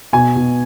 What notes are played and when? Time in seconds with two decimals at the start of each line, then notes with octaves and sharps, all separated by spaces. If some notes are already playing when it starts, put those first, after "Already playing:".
0.13 B2 G#5
0.36 B2